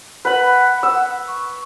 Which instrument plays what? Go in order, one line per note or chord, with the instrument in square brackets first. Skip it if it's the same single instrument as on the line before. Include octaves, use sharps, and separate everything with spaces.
[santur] B4 B5 [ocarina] F#5
[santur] E6
[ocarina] C#6